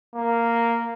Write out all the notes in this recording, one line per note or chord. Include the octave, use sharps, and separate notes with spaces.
A#3